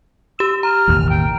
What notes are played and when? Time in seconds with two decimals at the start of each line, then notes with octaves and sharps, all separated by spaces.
0.39 G4 E6 E7
0.63 A#5 F6
0.88 E1 A1 D#2
1.09 G5